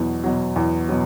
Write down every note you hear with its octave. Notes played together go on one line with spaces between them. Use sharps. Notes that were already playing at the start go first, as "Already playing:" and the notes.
Already playing: E2 B2 F#3
B2 F#3
E2
B2 F#3